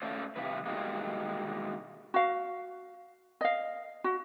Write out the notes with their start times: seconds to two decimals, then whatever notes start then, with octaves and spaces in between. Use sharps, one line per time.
0.02 A3 C#4 F4 A4 C5 D5
0.36 C3 F3 G3 B4
0.66 B2 D#3 G3 G#3 A#3
2.14 F#4 F5
3.41 D#5 F5
4.04 F#4